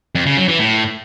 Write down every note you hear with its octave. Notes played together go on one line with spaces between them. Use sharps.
F2
C#3
F#3
E3
A2